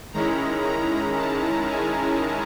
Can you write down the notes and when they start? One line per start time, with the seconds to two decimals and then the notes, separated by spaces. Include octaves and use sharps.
0.13 D#3 G#3 C#4 E4 A#5
0.64 A#5
1.16 A5
1.68 G#5